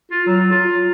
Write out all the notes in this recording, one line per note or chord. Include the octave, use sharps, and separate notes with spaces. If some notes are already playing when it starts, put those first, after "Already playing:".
F4
F#3
F4